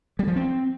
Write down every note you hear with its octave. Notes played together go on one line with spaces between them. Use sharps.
G3
F3
C4